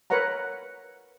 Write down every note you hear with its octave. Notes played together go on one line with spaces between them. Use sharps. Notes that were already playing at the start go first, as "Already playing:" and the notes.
A#4 B4 C#5 F#5 A#5